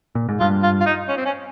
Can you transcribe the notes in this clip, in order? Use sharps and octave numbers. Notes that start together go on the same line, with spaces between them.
A#2
G#2
G2 F4
F4
F4
D#4
C#4
C4
C#4